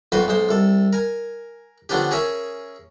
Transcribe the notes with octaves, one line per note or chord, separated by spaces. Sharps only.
B1 F2 F#4 B4 C5
B1 G#3 C5
C2 A4
A#4 G#5
D3 F3 B3 C#4 D4 G4
C#4 G#4 A#4 C#5 E5 G#5